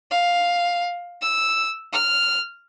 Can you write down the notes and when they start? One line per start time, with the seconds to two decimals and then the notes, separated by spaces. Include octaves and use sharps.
0.11 F5
1.22 E6
1.93 F6